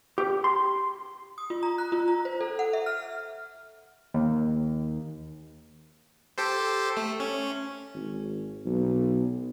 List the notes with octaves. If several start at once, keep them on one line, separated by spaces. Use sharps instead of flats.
G4
C6
D#6
F4
A#5
F#6
F4
A#5
C5
A4
F#5
E5
F6
D#2
G4 A4 C5
A3
C#4
G#1
B1